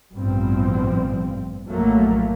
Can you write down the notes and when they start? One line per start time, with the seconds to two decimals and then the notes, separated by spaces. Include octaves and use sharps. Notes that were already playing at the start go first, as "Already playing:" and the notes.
0.13 A1 G2 B2 F3 C4
1.66 A#1 F#2 A2 F#3 A3 A#3